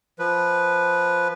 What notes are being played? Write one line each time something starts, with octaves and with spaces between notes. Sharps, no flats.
F3 B4